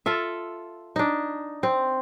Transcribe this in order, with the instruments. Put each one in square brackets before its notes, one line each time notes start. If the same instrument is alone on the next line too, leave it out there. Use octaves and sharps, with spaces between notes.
[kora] F4 A4 E5
D4 D#4
C4